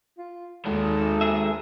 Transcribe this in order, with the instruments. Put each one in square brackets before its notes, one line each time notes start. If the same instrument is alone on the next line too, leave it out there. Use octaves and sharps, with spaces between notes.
[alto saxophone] F4
[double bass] D#2 [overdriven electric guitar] G#2 D#3 [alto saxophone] A4
[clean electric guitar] G#4 E5